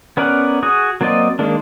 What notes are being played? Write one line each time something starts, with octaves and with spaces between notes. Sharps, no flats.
B3 C#4 A#4 D5 F#5
F#4 G#4 D#6
F#3 A#3 C4 D5 D#5
D#3 G#3 A#3 D4